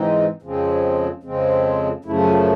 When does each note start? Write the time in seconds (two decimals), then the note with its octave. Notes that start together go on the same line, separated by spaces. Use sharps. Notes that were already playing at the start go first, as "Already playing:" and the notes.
Already playing: G#2 E3 G#3 C4 D#4
0.42 F2 C#3 F3 G#3 C4
1.23 F2 C#3 F3 G#3 C4
2.05 F#2 C#3 F3 A3 E4
2.26 F4